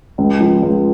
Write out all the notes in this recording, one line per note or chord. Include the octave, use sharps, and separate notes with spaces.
C#2
F3
C#2